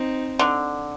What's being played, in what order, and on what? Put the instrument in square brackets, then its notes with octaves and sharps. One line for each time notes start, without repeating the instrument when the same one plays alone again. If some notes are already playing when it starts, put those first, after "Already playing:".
Already playing: [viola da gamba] C4 D#4
[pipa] D3